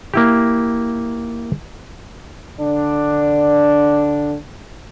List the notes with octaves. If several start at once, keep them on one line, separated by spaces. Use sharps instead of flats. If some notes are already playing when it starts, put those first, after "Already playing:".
A#3 E4 G4
D3 D4